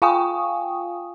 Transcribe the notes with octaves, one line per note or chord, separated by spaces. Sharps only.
F4 F5 G5 G#5 C#6 D#6